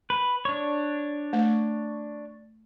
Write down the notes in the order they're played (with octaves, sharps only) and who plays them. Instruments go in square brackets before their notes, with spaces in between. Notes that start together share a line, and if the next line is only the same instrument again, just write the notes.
[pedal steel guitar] B4
D4 C#5
[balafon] A3